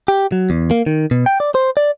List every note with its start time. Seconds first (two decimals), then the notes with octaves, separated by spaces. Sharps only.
0.08 G4
0.32 F#3
0.50 E2
0.71 A#3
0.86 D#3
1.11 B2
1.26 G5
1.40 D5
1.55 C5
1.77 D5